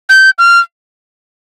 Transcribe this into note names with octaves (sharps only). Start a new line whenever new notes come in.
G6
F6